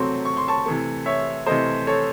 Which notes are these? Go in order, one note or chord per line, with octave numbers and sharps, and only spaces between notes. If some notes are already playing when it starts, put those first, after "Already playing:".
Already playing: C3 F#3 A3 C4 C6 C#6
C#6
C6
A5 C#6
C3 E3 A3
C#5 E5
C3 E3 A3 C5 D#5
A4 C#5